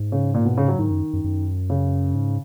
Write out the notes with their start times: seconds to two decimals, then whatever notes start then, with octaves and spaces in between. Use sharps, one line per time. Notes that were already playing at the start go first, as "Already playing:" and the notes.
Already playing: G#2
0.12 C#3
0.34 A#2
0.45 B2
0.57 C#3
0.68 F#3
0.79 G#2 D#3
0.91 F#2
1.13 F#2
1.24 F#2
1.70 C#3
2.15 G#2